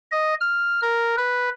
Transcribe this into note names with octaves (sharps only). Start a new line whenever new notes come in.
D#5
F6
A#4
B4